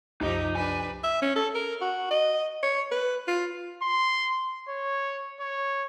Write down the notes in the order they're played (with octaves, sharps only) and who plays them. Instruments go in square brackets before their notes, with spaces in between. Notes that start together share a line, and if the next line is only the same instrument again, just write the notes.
[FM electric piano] C2 F#2 [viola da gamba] C3 F3 G4 [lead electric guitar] D#4 D#5
[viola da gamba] D4 B4 [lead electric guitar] G#5
[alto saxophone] E5
C#4
A4
A#4
F#4
D#5
C#5
B4
F4
[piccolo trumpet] C6
C#5
C#5